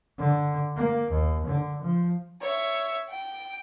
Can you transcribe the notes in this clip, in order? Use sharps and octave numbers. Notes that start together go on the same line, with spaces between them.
D3
A#3
D#2
D3
F3
C#5 E5
G5